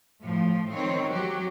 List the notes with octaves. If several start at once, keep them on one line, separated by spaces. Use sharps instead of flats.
A2 F3
D#3 C4 C#5
F#3 F#4 G4